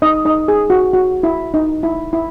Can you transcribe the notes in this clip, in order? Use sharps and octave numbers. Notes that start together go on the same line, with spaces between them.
D#4 D#5
D#4 D#5
G#4
F#4
F#4
E4
D#4
E4
E4